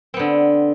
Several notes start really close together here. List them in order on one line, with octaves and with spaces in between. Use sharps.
C4 B3 D3